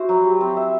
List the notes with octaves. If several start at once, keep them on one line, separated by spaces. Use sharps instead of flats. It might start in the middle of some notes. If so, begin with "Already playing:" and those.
Already playing: E4 F#4 C5
F#3
G4
C4
E5